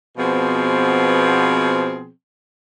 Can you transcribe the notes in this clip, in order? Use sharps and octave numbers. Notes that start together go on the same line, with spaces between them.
B2 F3 B3 C4 G#4